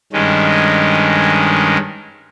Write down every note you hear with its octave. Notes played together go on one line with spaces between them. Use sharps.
G2 D#3 G#3 C#4